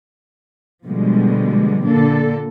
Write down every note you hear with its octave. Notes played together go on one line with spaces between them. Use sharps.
B2 D3 F3 G3 G#3
A#2 D3 A#3 D4 A4